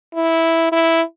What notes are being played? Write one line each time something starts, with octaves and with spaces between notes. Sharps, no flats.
E4
E4